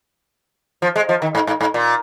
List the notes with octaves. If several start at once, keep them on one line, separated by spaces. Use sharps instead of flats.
F3
G#3
F3
D#3
G#2
G#2
G#2
A#2